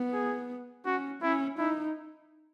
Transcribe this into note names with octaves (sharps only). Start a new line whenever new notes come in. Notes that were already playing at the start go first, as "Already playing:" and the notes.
Already playing: B3
G#4
C#4 F#4
C#4 E4
D#4 E4